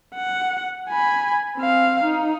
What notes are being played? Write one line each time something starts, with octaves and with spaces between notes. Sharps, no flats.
F#5
G#5 B5
C4 F5
D#4